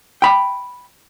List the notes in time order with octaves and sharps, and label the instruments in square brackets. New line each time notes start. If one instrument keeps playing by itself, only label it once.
[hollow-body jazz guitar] G5 B5